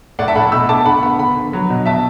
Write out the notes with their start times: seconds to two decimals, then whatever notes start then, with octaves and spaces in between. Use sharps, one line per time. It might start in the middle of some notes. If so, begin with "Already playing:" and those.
0.19 A2 D5 F#5
0.28 E5 A5
0.35 A2 F#5 B5
0.52 B2 B5 E6
0.69 A3 A5 D6
0.86 D3 F#5 B5
1.03 B3 F#5 B5
1.19 D3 F#5 B5
1.37 D3
1.53 F#3
1.70 B2
1.86 B2 E5 A5